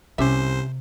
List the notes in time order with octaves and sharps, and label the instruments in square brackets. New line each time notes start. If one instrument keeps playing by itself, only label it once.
[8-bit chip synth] C2 C5 [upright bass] C3 [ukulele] C#4 G4 E5